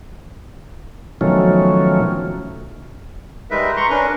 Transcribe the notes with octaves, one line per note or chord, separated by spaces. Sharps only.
B2 D#3 F3 F#3 A3 C#4
G3 G#3 D#4 A#4 B4 E5
A#5 C6 C#6
C#4 D4 A#4 B4